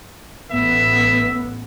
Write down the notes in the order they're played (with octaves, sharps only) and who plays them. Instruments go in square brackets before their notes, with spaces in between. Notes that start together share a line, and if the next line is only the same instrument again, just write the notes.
[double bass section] A1 B3 [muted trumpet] E5